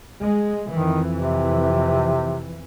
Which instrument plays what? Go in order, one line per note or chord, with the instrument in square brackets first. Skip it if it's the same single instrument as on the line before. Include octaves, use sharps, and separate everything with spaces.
[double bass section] G#3
[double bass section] F2 E3 [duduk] D#3
[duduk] C3